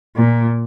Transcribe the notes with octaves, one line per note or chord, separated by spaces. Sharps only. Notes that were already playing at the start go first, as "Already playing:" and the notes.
A#2